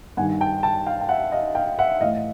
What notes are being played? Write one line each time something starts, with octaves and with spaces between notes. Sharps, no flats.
G2 D#3 F#5 G#5
G5 A5
G5 A5
F5 G5
G5
E5 F#5
D#5 F5
F5 G5
E5 F#5
A2 E3 D#5 F5